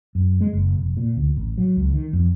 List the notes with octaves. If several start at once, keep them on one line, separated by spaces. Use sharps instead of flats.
F#2
G#3
F#1
F1
A#2
D2
A1
F#3
C#2
D#3
F2